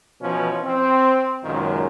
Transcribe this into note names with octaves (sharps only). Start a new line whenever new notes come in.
B2 E3 F3 C#4
C4
C#2 F#2 A#2 D#3